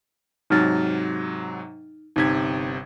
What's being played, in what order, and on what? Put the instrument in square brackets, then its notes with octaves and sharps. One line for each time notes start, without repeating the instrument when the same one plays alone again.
[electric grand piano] G#2 C3 F#3 [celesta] D#4 F6 A6
[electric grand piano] G1 C3 G#6 [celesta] D#4 B6